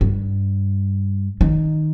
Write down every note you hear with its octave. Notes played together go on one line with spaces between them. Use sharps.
G2
D#3